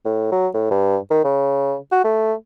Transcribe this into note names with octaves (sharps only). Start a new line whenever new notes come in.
A2
F#3
A2
G2
D#3
C#3
F#4
A3